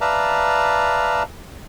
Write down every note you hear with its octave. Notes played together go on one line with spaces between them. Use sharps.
B4 D5 E5 F5 A5 A#5